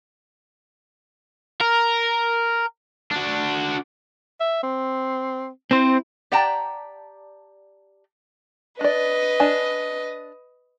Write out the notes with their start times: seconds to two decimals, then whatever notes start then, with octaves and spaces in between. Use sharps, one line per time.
1.61 A#4
3.11 D4 F#4
4.40 E5
4.63 C4
5.71 C4 E4 C5
6.32 G4 D5 F#5 G5 A5 A#5
8.81 D4 B4 D5 D#5
9.40 D4 G#5